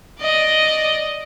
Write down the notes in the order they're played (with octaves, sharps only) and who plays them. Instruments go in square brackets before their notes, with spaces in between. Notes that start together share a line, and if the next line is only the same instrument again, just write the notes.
[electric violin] D5 D#5